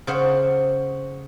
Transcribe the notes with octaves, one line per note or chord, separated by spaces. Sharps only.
C#3 C5 F#5